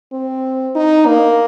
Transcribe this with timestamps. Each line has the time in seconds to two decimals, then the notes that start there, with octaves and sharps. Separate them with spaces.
0.12 C4
0.75 D#4
1.06 A#3